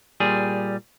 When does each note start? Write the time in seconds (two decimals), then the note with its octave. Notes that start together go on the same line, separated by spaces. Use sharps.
0.20 A#2 G3 G#4